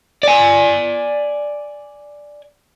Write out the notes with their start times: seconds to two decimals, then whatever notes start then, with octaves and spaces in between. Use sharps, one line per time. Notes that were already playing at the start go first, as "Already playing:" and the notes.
0.23 D5 G#5